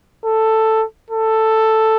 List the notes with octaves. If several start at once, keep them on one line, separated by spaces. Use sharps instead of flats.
A4
A4